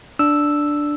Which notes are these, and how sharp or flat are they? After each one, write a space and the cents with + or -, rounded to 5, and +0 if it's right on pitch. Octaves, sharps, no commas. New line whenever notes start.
D4 +0 E6 +0